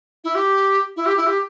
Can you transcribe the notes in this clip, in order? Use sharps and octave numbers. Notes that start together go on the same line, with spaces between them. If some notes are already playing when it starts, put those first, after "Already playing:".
E4
G4
E4
G4
E4
G4